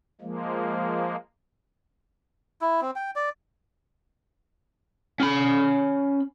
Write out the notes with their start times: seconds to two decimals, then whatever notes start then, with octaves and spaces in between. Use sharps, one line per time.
0.21 F3 G#3 A#3
2.62 E4
2.81 C4
2.96 G5
3.16 D5
5.20 C#4 B5